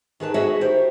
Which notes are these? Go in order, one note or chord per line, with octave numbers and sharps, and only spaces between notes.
D#3 G#4 B4 A5
F#4 G#4 B4 C#5 D#5 E5
D#3 E4 G4 C5